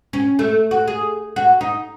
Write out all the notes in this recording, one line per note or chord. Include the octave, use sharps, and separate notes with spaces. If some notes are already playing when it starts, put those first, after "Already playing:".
C#4
A3
F#4
G#4
F#4
D#4